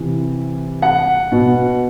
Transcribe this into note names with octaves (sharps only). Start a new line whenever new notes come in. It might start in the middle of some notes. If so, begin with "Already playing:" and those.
Already playing: C3 E3
F#5
B2